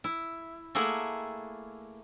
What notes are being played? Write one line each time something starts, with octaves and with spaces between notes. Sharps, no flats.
E4
A3 A#3 E4 G#4 F#5